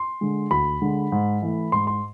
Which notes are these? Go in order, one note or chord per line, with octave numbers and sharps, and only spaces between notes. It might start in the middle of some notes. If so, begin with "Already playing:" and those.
Already playing: C6
D3 G#3
D2 B5
D3 G#3
G#2
E3 A3
G#2 C6
C6